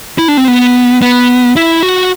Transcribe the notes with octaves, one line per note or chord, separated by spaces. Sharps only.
E4
D4
C4
B3
B3
E4
F#4